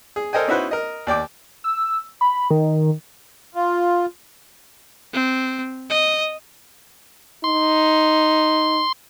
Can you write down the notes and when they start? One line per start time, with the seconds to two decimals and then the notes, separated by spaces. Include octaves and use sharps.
0.16 G#4
0.33 A4 A#4 C5 D#5 G5 G#5
0.48 C#4 D#4 E4 F#4 B4 C5
0.71 A#4 D#5
1.07 D#2 D5 G5 D6
1.64 E6
2.21 B5
2.51 D#3
3.55 F4
5.13 C4
5.90 D#5
7.44 D#4 C6